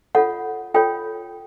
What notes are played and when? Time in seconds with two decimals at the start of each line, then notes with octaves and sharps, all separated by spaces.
0.15 F4 A4 C#5 F#5
0.74 F4 A4 C#5 G5